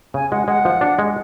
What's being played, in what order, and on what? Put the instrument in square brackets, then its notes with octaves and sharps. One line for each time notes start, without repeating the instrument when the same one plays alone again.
[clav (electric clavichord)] C#3 [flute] G#5
[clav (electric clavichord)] G#3 [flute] F#5
[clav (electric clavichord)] G#3 [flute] F#5
[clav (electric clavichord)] F3
D4
G#3